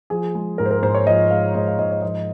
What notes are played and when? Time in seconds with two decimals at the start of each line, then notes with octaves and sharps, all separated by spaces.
0.10 F3 G#4
0.35 G#3
0.58 G#2 A#4
0.66 C5
0.71 A#4
0.82 G#2 C5
0.95 C#5
1.07 F3 D#5
1.31 G#3 F5
1.55 G#2 D#5
1.67 F5
1.78 G#2 D#5
1.91 C#5
2.02 F3 D#5